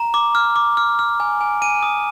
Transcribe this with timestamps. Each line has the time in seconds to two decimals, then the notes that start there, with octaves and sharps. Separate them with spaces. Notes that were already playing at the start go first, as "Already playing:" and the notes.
Already playing: A#5
0.14 D6
0.35 F6
0.56 D6
0.77 F6
0.99 F6
1.20 G#5
1.41 G#5
1.62 G#5 D#7
1.83 D#6